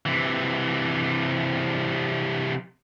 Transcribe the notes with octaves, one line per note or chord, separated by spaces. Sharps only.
C3 E3